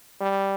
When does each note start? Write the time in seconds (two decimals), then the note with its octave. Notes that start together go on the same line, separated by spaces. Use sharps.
0.21 G3